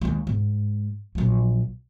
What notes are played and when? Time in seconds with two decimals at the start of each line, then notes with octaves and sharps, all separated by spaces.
0.01 D#2 G#3
0.27 G#2
1.15 A#1 F#3